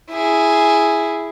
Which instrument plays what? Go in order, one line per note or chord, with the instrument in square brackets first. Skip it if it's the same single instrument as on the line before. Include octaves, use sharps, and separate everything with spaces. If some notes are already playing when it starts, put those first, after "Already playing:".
[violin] E4 G#4